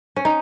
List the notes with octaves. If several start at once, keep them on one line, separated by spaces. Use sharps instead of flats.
C#4
D#4